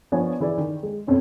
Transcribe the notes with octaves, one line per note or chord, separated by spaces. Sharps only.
F3 B3 D4 C#5 G#5
E3 E4 G#4 D5
D#3
G#3
F2 B2 C#4